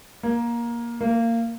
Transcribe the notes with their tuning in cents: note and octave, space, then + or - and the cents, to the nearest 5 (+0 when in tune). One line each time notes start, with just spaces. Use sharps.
A#3 +15
A#3 -20